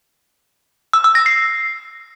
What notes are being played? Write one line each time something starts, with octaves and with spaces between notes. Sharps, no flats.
E6
E6
A#6
C7